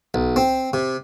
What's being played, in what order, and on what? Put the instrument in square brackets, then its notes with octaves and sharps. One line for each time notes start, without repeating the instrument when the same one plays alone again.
[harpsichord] B1
C4
C3